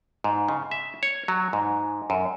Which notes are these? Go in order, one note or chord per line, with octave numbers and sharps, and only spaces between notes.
G#2
C#3
E5
C#5
F#3
G#2
F#2